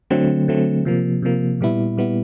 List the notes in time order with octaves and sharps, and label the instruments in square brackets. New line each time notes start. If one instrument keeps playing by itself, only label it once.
[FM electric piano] D3 F#3 A3 C4
D3 F#3 A3 C4
C3 F3 A#3
C3 F3 A#3
A#2 G3 B3 E4
A#2 G3 B3 E4